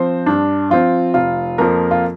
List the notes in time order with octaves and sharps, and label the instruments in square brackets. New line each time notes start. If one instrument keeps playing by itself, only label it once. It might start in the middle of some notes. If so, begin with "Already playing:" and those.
Already playing: [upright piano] F3 C4 C5
G2 D4
F3 C4 F4
F1 F4
F2 F3 A#3 A#4
F4